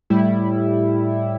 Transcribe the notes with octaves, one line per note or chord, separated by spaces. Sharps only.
A2 G3 E4